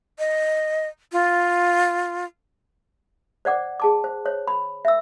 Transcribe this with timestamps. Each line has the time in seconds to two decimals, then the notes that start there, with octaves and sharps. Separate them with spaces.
0.19 D#5
1.12 F4
3.45 C5 D5 F#5 D6
3.80 G#4 A5 D6
4.04 C5
4.26 C5 C#5
4.47 B5
4.85 E5 E6